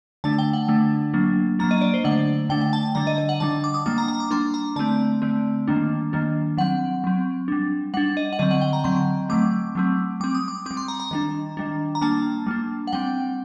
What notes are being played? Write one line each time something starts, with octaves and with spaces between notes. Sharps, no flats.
D3 A3 D4 A5
G5
F#5
D3 A3 D4
F#3 A#3 D4
F#3 A#3 D4 A#5
D#5
D5
C5
D3 A3 D4 F#5
D3 A3 D4 G5
G5
A5
D3 G3 D4 A#5
D#5
D#5
F#5
D3 G3 D4 A5
D6
D#6
G3 A#3 D4 D6
A#5
A#5
D6
G3 A#3 D4 C6
A#5
D3 A3 C4 A5
D3 A3 C4
D#3 G3 A#3 D4
D#3 G3 A#3 D4
F#3 C4 F#5
F#3 C4
G3 D4
G3 D4 F#5
D#5
F#5
D3 F#3 C4 D#5
F#5
G5
A#5
D3 F#3 C4 C6
F#3 A3 C4 D6
F#3 A3 C4
G3 C4 D6
D#6
D6
G3 C4 D6
C6
A#5
A#5
D#3 G3 D4
D#3 G3 D4
A#5
G3 A#3 D4 A5
G3 A#3 D4
F#5
G3 C4 G5